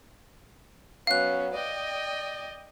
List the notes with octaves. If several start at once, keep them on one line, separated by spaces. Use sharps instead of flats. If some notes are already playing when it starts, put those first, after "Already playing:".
F#3 B3 C#4 F5 F#6
D5 D#5 G5